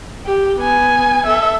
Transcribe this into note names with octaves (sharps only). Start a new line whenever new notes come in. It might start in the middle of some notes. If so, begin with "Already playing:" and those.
G4
B3 G#5
A4 E5